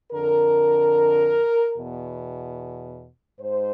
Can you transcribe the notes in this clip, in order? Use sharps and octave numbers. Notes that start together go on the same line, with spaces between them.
F2 D3 A#4
E2 B2
G#2 C5